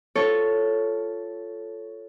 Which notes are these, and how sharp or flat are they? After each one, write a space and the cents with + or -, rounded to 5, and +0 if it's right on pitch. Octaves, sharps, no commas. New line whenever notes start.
F4 +0 A4 +0 C#5 +0